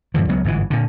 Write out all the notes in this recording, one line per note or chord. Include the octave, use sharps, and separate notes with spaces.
G2 D3 E3 F3
C#2 F#3 B3
G1 G#2 D3 E3
A#2 D3